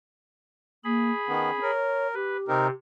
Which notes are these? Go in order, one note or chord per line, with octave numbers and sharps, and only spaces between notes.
A#3 G#4 B5
D#3 B3 C#4
A#4 C#5
G4 B4
C3 C4 D#4 A#4